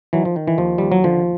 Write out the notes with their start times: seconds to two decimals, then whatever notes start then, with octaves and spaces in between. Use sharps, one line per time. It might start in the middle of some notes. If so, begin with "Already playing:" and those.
0.13 D#3 E3 F#3
0.25 F3
0.36 D#3
0.48 E3
0.58 D#2 F3
0.78 D#2 G3
0.92 F#3
1.04 D3 F3